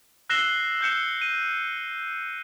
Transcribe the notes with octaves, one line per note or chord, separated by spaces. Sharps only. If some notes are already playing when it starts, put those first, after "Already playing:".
E6 F#6 A#6 C7 E7 G7
F#6 G6 C#7 E7
D#7